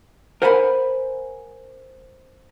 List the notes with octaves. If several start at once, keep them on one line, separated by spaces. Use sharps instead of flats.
A#4 C5 F#5 G#5 A5 B5